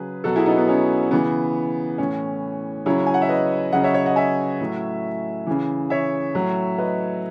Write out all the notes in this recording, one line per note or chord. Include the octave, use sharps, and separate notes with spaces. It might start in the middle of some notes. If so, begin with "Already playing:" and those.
Already playing: C#3 F#3 G#4 B4
B2 F#3 F#4 A4
E4 G#4
B3 D#4
B3 D#4
C#4
C#3 E3 B3
A2 E3 C#4
C#3 F#3 C#4 E4
G#5
F#5
E5
B4 D#5
C#3 F#3 D#5 F#5
C#5 E5
C#5 E5
D#5 F#5
E5 G#5
A2 F#3
C#3 E3
C#5 E5
A2 F#3
B4 D#5